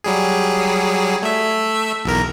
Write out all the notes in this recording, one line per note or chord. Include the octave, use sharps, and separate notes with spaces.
F#3 G3 G#4
A3 E5
B1 E2 A#4